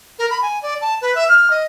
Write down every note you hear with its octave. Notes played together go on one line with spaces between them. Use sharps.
A#4
B5
G#5
D5
A5
B4
E5
F6
D#5